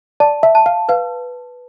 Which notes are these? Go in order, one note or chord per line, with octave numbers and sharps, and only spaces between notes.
D5 A5
E5
A5
F5
B4 F5